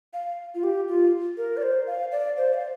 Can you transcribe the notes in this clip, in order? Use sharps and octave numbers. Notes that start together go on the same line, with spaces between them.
F5
F4
G4
F4
A#4
D5
C5
F5
D5
C5
F5